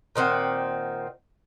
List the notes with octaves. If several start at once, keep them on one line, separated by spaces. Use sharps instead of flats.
A#2 D#3 C4 F#5